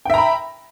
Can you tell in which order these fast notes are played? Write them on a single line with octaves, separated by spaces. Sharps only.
G5 E5 A#5 B5